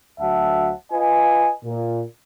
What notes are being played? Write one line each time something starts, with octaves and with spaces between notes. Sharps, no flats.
D2 F#3 E5 F#5 A5
F4 B4 D#5 G#5
A#2